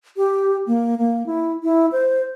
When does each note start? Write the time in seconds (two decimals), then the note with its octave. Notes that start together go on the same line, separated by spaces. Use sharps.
0.17 G4
0.66 A#3
0.98 A#3
1.26 E4
1.63 E4
1.92 C5